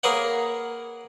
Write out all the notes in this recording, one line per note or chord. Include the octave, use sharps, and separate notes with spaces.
A#3 G#4 A#4 B4 C#5 F#5